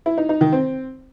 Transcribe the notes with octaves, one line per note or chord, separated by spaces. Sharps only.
E4
D#4
D#4
D#3
C4